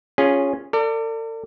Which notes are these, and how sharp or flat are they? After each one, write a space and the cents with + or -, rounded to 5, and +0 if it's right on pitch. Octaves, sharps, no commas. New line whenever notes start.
C#4 +0 F4 +5 G#4 -15
A4 +45 D5 +0